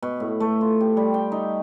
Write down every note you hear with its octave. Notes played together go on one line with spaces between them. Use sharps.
B2
A2
A3
F4
G4
G3
G5
D#4